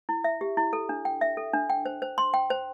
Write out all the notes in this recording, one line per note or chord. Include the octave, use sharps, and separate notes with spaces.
E4
E5
G4
E4
A4
D4
G5
E5
A4
D4
G5
C5
C5
C6
G5
C5